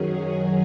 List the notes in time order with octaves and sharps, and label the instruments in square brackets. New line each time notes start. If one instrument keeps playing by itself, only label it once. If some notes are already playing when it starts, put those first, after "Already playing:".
Already playing: [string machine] F#2 D#3 F#3 C#4 G#4